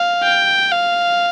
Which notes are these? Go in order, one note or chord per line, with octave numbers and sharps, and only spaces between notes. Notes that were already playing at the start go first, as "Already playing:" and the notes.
Already playing: F5
G5
F5